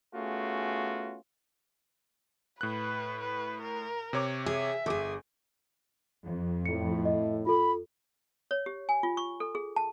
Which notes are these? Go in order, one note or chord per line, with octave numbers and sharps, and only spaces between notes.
A3 B3 C#4 F4 F#4 G#4
A2 B4 F#6
B4
A#4
C3 C#5 D6
G#4 E5
G1 G#4 A4 D6
F2
A2 C#7
D#5
F4 A4 B5
C#5
G4
G#5
F4
C#6
A4
G#4
A5